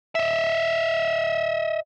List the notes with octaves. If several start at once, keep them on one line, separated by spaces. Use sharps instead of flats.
D#5 E5